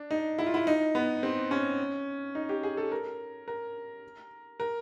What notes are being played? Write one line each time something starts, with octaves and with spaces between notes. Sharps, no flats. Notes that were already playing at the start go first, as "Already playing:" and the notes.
Already playing: D4
D#4
E4
F4
E4
D#4
B3
C4
C#4
D#4
G4
G#4
A4
A#4
A#4
A#4